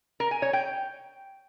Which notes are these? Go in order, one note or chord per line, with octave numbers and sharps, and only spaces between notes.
A#4
G#5
C#5
G5